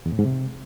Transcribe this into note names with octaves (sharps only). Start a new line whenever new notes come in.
E2
A2
G#2
C3